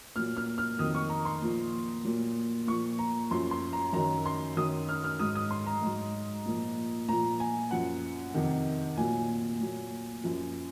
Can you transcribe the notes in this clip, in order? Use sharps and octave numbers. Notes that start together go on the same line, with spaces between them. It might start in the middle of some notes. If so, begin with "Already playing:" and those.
A#2 F#3 F6
F6
F6
F2 D#3 F#3 D#6
C#6
A#5
C6
A#2 F3
A#2 F#3
A#2 F3 C#6
A#5
F#2 F3 C6
C6
A#5
F#2 D#3 F#3 A#5
C6
F#2 D#3 F#3 D#6
F6
F6
G#2 F#3 D#6
D#6
C6
A#5
G#2 F#3
A#2 F3
A#2 F3 A#5
G#5
F#2 F3 F#5
F2 C3 D#3
A#2 F#3 G#5
A#2 F#3
F#2 F3